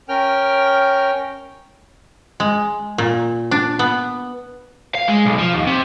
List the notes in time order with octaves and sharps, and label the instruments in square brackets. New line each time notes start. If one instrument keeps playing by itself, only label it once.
[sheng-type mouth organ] C#4 A#4 G5 F6
[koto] G#3
A#2
D4
B3
[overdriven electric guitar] F5
G#3
B1
F3
D#2
C3